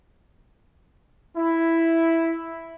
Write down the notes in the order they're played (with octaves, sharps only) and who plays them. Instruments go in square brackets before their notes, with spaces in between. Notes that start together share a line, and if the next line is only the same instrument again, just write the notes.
[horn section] E4